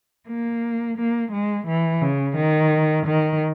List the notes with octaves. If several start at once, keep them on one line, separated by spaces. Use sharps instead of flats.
A#3
A#3
G#3
E3
C#3
D#3
D#3